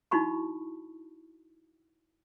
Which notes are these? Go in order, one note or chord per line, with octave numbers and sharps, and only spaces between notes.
D#4 E4 F#4 A5 B5 C#6